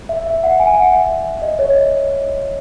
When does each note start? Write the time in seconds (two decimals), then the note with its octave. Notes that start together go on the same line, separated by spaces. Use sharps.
0.09 E5
0.27 E5
0.43 F#5
0.60 G#5
0.76 F#5
0.93 E5
1.42 D#5
1.59 C#5
1.75 D#5